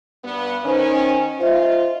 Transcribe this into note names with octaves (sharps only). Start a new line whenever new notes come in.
G2 B3
D#3 C#4 D#4 C5 G#5
F4 C5 D#5 E5